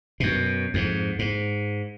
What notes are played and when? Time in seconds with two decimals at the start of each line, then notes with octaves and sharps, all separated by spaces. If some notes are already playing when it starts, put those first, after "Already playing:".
0.20 F#2 B2
0.74 F2 G#2
1.19 G#2